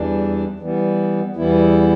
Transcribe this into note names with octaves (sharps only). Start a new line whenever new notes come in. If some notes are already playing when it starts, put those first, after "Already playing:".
Already playing: E2 E3 G3 D4
E3 G3 B3
E2 E3 G3 B3 E4